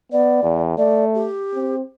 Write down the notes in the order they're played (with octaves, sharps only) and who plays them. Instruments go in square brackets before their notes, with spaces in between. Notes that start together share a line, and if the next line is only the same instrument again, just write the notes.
[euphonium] B3 [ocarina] D5
[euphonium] E2
[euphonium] A3 [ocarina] D5
[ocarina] G4
[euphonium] C4